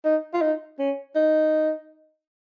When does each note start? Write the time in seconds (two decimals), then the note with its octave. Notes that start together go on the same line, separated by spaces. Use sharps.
0.05 D#4
0.34 F4
0.42 D#4
0.79 C#4
1.15 D#4